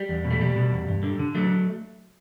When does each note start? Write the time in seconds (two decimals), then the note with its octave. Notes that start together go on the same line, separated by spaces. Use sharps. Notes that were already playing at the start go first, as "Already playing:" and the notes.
Already playing: G3
0.09 E2
0.25 B2
0.31 A3
0.40 B2 G3
0.55 B2
0.72 E2
0.88 G2
1.03 D3
1.19 D3
1.35 F#3 A3